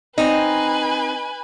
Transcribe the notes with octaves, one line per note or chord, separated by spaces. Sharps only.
C4 D#4 B4 G#5